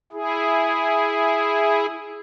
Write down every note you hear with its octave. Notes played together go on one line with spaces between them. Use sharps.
E4 G#4